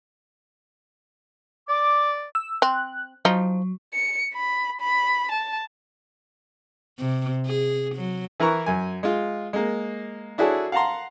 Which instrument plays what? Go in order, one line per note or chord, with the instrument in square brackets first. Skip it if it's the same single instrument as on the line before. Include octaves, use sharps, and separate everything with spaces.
[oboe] D5 [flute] D6
[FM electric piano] E6
[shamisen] C4 [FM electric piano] F#6
[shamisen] F3 D#4 [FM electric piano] F#3
[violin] C#7
B5
B5
A5
[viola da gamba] C3
G#4
F#3
[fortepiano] E3 E4 A#4 B4 A#5 C#6
F#2 G#5
G#3 F4
G#3 A#3
D4 E4 F#4 G#4 A4 C#5
F5 F#5 A5 A#5 C6